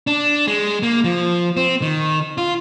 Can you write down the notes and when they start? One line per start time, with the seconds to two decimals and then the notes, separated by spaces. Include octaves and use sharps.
0.07 D4
0.47 G#3
0.83 A#3
1.04 F3
1.57 C4
1.82 D#3
2.38 F4